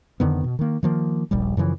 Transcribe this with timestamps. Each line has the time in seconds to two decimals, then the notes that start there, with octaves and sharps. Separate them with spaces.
0.20 F2 D3 D#3 B3
0.44 B2
0.59 D#3 A#3
0.83 D#3 F3 A#3
1.31 D#1 A#1 G3
1.57 F#2 C#3 E3 F3